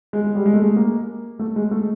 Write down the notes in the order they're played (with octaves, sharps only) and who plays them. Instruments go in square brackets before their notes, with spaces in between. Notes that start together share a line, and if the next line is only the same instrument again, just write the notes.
[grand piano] G#3
G#3
G3
G#3
A3
G#3
A#3
A3
G#3
A3